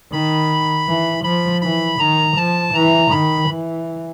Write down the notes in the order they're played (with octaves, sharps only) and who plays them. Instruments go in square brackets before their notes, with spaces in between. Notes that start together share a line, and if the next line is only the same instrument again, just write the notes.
[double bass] D#3 [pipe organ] B5
[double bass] E3
[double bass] F3 [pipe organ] B5
[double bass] E3 [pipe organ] B5
[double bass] D#3 [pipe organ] A#5
[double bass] F3 [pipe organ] A5
[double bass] E3 [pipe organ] A#5
[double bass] D#3 [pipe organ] B5
[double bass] E3